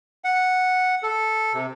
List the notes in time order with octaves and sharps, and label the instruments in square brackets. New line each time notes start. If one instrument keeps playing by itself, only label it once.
[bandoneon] F#5
A4
C3